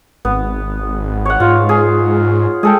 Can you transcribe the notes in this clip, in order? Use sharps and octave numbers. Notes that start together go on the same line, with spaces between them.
G#1 B3
C#5 F#5
G#2 F4
G#4
G#3 G#4 A4 G5